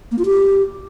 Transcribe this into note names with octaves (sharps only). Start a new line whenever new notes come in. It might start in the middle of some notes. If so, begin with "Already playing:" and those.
A#3
F4
G4